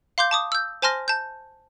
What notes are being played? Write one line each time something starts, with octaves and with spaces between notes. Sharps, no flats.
F5 C6 D6 G6
A5 D6 D#6
E6 G6
C5 G#5 A5 C6 F6 A#6
A5 G6